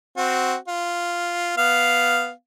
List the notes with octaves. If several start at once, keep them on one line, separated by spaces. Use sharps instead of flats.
C4 F#4
F4
B3 F5